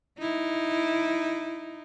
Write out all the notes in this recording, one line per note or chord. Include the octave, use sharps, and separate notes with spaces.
D#4 E4